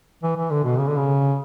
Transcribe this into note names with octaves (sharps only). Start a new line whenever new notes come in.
E3
E3
D3
B2
C#3
D3
C#3